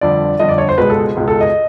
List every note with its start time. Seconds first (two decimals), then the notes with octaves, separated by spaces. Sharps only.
0.01 G1 F2 D3 D5
0.39 G1 F2 D3 D#5
0.49 D5
0.58 C#5
0.69 C5
0.78 C#2 B2 G#3 B4
0.90 A4
1.16 C#2 B2 G#3
1.28 A4
1.41 D#5